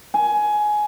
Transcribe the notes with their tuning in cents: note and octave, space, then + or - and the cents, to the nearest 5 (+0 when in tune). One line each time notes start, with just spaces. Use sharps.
G#5 +15